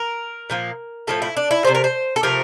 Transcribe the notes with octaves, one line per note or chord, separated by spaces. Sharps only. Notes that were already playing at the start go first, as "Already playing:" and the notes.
Already playing: A#4
A#2 F3 A#3
A2 F3 A3 A4
E4
D4
E4
C3 F3 A3 C5
A#4
C5
A4
C3 F3 A3 A#4